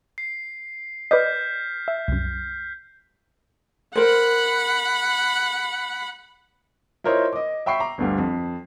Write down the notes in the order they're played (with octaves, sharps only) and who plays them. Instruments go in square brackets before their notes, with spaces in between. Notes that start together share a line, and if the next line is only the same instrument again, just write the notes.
[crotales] C7
[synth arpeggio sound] B4 D5 D#5 [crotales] F6 G6 B6
[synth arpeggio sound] E5
C2 F#2
[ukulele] A#4 C5 [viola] F#5 B5
[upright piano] E4 F4 A#4 C5 C#5 D#5
D#5 D6
E5 G5 B5 C#6 C7
A#5 D6
G1 D2 G3
F2